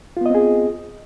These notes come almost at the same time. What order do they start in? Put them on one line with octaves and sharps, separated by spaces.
F4 B3 D#5 C4 G#4